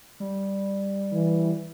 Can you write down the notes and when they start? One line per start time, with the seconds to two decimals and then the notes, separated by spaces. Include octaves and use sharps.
0.20 G3
1.13 E3